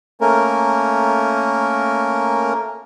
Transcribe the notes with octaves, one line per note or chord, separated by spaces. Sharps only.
A3 A#3 C#4 A#4